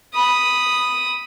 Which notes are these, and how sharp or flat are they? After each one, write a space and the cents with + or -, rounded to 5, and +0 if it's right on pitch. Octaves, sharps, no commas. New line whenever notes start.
B5 +0 D#6 +0